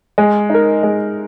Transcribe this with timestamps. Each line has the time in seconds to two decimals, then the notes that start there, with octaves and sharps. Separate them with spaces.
0.18 G#3
0.50 D#4 A#4
0.83 G#3